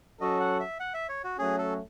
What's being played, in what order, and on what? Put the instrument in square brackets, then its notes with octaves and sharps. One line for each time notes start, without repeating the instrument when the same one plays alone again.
[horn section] F#3 C#4 F#4 A4 [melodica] D#5
[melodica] F#5
E5
F#5
E5
C#5
F#4
[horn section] F#3 A3 C#4 [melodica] G#4
[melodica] A4